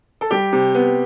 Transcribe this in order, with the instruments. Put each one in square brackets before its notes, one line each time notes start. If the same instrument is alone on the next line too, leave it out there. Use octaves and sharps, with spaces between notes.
[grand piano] A4
G3 G4
C3
B3